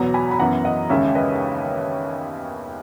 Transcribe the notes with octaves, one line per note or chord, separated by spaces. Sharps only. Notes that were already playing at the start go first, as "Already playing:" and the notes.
Already playing: E2 B2 F#3 B3 F#5 A#5
G#5 B5
B5
F#2 E3 B3 F#5 A#5
D#5 F#5
D#2 C#3 G#3 C#4 C#5 E5
B4 D#5